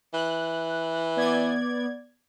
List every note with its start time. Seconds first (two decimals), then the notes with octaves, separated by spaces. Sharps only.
0.14 E3 F#6
1.16 B3 D5 G#6